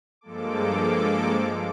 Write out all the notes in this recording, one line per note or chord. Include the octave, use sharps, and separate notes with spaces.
G2 F3 G#3 A#3 A4 D6